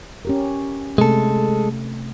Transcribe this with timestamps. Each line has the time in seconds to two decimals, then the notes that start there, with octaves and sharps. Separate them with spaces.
0.25 C#4 G4 A#4
0.98 C3 G#3 A3 A4